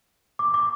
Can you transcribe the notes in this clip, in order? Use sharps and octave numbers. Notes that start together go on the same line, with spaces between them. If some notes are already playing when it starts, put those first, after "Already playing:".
D6
D6